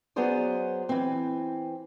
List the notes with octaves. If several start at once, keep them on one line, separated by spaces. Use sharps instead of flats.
F#3 B3 C#4 G#4 C5 D5
E3 C4